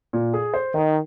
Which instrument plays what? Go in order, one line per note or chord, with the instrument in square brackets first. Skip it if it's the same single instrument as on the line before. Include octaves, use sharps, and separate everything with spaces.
[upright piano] A#2
G#4
C5
[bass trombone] D#3 [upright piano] D#4